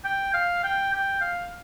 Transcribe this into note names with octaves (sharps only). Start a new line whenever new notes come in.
G5
F5
G5
G5
F5